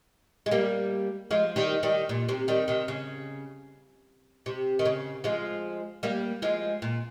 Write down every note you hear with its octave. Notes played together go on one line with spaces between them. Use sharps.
G#3
G3 A#3
F3 G#3
D#3 G3
D#3 G3
A#2
C3
D#3 G3
C3 D#3
C#3
C3
D#3
C#3
F3 G#3
G3 A#3
F3 G#3
A#2